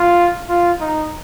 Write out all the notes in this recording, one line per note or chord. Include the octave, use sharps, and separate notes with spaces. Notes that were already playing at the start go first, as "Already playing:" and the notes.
Already playing: F4
F4
D#4